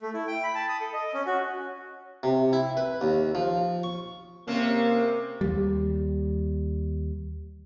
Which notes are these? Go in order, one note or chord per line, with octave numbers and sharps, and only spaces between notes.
A3
E4
G5
B5
A5
D#6
A4
D#5
C#4
F#4
C3
E4
B4
D#2
F3
C#6
C3 A#3 C4 C#4
D#2 G3